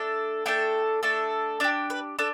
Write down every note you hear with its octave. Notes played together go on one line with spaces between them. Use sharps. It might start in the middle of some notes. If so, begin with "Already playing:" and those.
Already playing: A3 D4 A4
A3 D4 A4 G5
A3 D4 A4
D4 G4 D5
B4
D4 A4